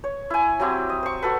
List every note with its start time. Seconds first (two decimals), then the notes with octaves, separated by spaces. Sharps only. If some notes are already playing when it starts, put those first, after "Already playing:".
0.04 C#5
0.30 E4 G#5
0.60 F#3 C4 E4 G4
0.89 D#5
1.03 C5 C#6
1.22 F#4 A4 B4